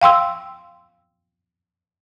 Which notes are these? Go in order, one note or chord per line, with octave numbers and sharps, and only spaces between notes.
F5 G5 C6 E6